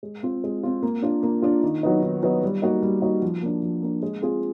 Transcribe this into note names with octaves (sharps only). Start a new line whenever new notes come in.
G#3
C4 F4
G#3
C4 F4
A#3
D4 F4
A#3
D4 F4
D#3
F#3 B3 D#4
D#3
F#3 B3 D#4
G3
A#3 D#4 F#4
G3
A#3 D#4 F#4
F3
A#3 D4
F3
A#3 D4
G#3
C4 F4 G#4